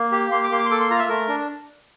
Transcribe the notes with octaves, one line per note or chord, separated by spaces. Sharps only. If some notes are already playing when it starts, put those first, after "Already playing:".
Already playing: A#3
G4
A#3 C6
D6
A#3 C6
D6
C6
A4 D6
C6
F4 F5 A#5
E5
A3 A#4
D4